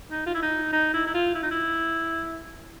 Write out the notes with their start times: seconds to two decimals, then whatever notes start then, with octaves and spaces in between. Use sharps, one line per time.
0.11 D#4
0.26 F4
0.34 E4
0.42 D#4
0.73 D#4
0.94 E4
1.07 E4
1.14 F4
1.35 E4
1.43 D#4
1.51 E4